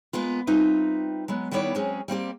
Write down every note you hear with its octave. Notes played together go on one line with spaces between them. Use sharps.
G#3 A#3 B3 F4
G3 C4 D#4 F4 B4 E5
F#3 G#3 B3
D#3 G3 B3 E4 C#5 D5
F#3 G#3 C4 C#4 G#4
G3 A#3 C4 G4